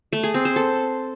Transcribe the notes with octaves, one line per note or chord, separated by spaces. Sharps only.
A3
G#4
C4
C5
A4